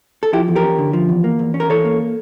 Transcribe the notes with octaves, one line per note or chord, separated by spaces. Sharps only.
A4
F3 E4 G4
E2
G4 A#4
C#4
D3
F3
E2
A#3
E2
C#4
A#4
E3 A4 C#5
A#3